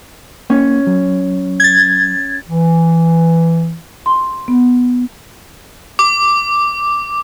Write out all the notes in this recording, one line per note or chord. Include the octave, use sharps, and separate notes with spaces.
A#3 C#4
F#3
G#6 A6
E3
C6
B3
D6